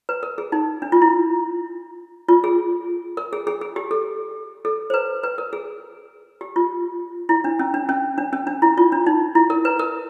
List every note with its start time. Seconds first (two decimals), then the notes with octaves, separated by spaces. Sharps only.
0.09 B4
0.23 A#4
0.38 G#4
0.52 D#4
0.82 D4
0.92 F4
1.02 E4
2.28 F4
2.44 G#4
3.17 A#4
3.33 G#4
3.47 G#4
3.61 G#4
3.76 G4
3.91 A4
4.65 A4
4.90 C5
4.94 B4
5.23 B4
5.38 A#4
5.53 G#4
6.41 G4
6.56 F4
7.29 E4
7.44 D4
7.59 C#4
7.74 D4
7.89 C#4
8.18 D4
8.33 C#4
8.47 D4
8.62 E4
8.78 F4
8.92 D4
9.06 D#4
9.35 E4
9.50 A#4
9.65 B4
9.79 A#4